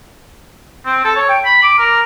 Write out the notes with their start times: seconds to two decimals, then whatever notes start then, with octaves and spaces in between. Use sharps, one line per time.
0.85 C4
1.04 A4
1.16 C#5
1.29 G5
1.45 B5
1.62 D6
1.78 A#4